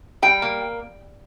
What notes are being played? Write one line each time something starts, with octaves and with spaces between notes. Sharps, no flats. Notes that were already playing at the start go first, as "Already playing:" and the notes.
G3 G5
A#3